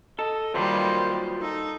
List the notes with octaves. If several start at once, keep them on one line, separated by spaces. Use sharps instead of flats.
A4 D#5
D#3 F#3 G3 A#3 F4 B4 C5
D#4 A4